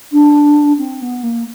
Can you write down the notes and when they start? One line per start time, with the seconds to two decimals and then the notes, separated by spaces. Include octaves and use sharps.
0.12 D4
0.78 C4
1.02 B3
1.23 A#3